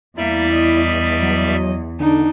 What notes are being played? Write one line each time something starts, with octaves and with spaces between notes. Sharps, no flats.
E2 G3 A#3 E4 D5 E5
D#5
F#3
D3 D4 D#4